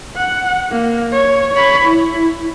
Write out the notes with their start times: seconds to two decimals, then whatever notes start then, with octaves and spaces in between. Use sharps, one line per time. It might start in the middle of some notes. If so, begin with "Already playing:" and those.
0.16 F#5
0.72 A#3
1.13 C#5
1.54 C#5 B5
1.85 E4